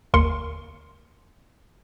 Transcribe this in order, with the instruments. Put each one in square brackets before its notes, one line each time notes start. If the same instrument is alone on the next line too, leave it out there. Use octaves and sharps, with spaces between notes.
[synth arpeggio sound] G1 D#2 A#3 A#4 C6 C#7